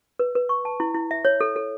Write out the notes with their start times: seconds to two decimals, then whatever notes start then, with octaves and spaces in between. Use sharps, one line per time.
0.19 B4
0.35 B4
0.49 C#6
0.65 A5
0.80 E4
0.94 E4
1.11 E5
1.25 C#5
1.41 A4
1.56 A4